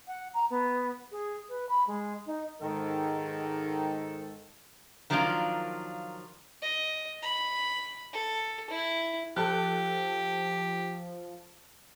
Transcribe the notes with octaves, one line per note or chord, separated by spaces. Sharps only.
F#5
A#5
B3
G#4
B4
B5
G#3
D#4
G#2 D#3 A4
D#3 F3 F#3 A#3 D4 F4
D#5
B5
A4
E4
F3 G4 A4 A5 F#6